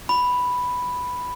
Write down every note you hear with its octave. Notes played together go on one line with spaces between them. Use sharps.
B5